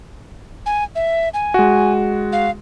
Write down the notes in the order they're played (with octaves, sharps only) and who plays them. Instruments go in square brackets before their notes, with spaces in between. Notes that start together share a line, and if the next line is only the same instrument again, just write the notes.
[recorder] G#5
E5
G#5
[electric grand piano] G#3 F#4
[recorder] F5